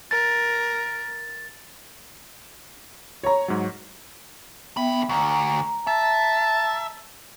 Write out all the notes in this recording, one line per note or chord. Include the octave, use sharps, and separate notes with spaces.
A#4 A6
C#5 A#5
G#2 F#3
D3 B3 E5 G5 B5
D2 A#5
E5 A5